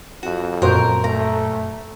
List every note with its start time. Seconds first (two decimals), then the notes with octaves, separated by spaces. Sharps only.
0.23 F2 F#4
0.62 F#2 A#2 F#4 A#4 C5
1.04 A3 A#5